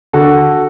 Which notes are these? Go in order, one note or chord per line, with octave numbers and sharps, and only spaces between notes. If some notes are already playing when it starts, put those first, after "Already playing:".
D3 F#4 A4